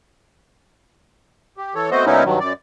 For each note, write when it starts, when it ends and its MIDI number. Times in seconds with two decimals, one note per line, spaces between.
1.57 1.74 67
1.75 1.90 52
1.75 1.90 69
1.75 1.90 73
1.91 2.05 57
1.91 2.05 59
1.91 2.05 60
1.91 2.05 66
1.91 2.05 72
1.91 2.05 75
2.06 2.24 46
2.06 2.24 54
2.06 2.24 59
2.06 2.24 61
2.06 2.24 63
2.06 2.24 64
2.24 2.39 43
2.24 2.39 51
2.24 2.39 54
2.40 2.53 42
2.40 2.53 74